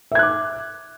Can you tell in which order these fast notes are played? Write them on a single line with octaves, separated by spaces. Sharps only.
E5 G#6 F#6 D6